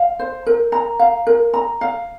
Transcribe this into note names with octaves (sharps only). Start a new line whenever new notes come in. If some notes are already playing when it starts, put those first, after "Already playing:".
Already playing: F5
C5
A#4
A#5
F5
A#4
A#5
F5